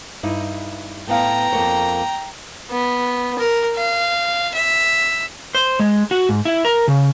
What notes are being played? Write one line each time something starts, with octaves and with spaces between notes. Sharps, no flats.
G2 D#4 E4
A2 B3 F5 G5 A#5
F2 A#3 C#5
B3
A#4
F5
E5
C5
G#3
F#4
G#2
E4
A#4
C#3